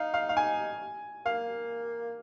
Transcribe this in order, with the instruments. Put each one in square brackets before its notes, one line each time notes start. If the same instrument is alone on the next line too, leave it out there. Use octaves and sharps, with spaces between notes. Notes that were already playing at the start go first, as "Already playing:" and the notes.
Already playing: [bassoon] D#4 [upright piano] F5
[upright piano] F5
F5
G#5
[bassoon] A#3 [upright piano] F5